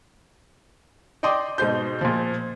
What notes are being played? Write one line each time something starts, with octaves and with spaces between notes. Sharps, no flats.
D5 D#5 G5 C6 D6 D#6
G#2 B2 C5 G6
A#2 F3